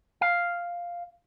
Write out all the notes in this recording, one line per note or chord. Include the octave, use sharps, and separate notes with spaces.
F5